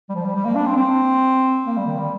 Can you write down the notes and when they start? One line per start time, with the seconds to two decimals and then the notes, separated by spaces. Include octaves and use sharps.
0.09 G3
0.15 F3
0.25 G3
0.35 G3
0.45 A#3
0.55 D4
0.66 C4
0.76 C4
1.66 A#3
1.77 G3
1.86 D#3
1.98 G3